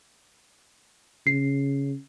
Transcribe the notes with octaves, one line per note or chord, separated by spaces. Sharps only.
C#3 C7